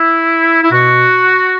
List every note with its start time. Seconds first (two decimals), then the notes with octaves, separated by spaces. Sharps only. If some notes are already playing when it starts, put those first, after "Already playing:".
Already playing: E4
0.63 E4
0.71 B2 F#4